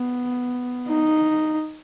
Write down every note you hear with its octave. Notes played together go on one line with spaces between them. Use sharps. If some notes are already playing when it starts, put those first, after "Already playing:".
Already playing: B3
D#4